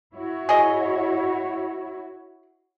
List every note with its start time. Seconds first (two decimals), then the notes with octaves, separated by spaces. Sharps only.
0.13 E4 F#4 C#5
0.49 G#4 D#5